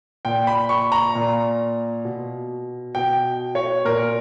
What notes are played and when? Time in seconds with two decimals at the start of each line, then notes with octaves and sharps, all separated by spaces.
0.25 A#2 G5
0.47 B5
0.69 C#6
0.92 A#5
1.15 A#2
2.05 B2
2.95 B2 G5
3.55 C#5
3.85 A#2 A#4